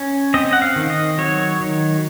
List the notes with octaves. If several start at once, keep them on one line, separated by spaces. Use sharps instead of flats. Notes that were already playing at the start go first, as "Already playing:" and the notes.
Already playing: C#4
C4 D#5
F#5
F5
D#3
D#5
F#3 C#5
D#3